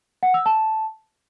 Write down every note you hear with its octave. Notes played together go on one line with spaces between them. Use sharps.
F#5
E6
A5